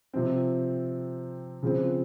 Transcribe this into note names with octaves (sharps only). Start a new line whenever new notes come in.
C3 F3 C4
C#3 F3 C4